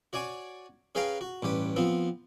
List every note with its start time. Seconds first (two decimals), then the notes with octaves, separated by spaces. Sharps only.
0.13 F#4 C#5 D5 G#5 C#6
0.95 C#4 G#4 B4 F5 G5 A#5
1.21 F#4
1.43 A1 G2 G4 B4
1.76 F3 B3 C4